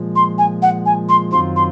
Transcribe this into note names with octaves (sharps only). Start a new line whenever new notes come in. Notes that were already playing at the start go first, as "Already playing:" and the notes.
Already playing: A#2 F3 G#3
C6
G#5
F#5
G#5
C6
F#2 D#3 F#3 C4 F4 C6
C6